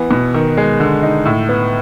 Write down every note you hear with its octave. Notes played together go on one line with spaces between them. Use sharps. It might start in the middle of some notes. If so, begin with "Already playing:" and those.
Already playing: E3 B3
B2
D#3
G#3
D3
D#4
A2
B3